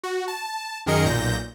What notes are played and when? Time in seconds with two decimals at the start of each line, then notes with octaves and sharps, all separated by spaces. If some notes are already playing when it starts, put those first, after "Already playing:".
0.04 F#4
0.28 A5
0.86 F#2 D#3 G#4 A#4 D#5 C#7
1.05 B1 A#2 G6 A#6